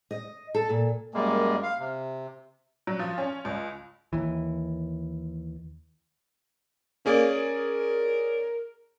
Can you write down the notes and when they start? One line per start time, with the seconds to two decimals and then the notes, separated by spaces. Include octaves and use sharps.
0.11 D#5
0.54 A4
0.70 A#2
1.14 F#2 G3 G#3 A#3
1.63 F5
1.79 C3
2.87 F#3
2.99 F3
3.18 C#4
3.45 C#2
4.13 D#2 E3
7.06 A#3 C#4 G#4 D5
7.32 A#4